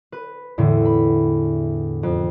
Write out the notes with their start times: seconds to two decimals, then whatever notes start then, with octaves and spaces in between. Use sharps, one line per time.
0.12 B4
0.58 E2 A2 D3
0.85 B5
2.03 F2